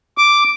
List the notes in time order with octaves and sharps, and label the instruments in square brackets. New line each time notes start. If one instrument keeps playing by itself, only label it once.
[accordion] D6